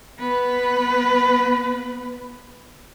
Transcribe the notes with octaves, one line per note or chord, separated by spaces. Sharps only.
B3 B4